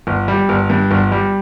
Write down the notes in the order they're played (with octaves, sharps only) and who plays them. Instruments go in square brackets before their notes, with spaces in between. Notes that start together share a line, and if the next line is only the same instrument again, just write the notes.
[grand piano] G1
G3
G1
G2
G1
G3